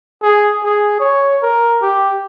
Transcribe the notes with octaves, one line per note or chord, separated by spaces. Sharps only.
G#4
G#4
C#5
A#4
G4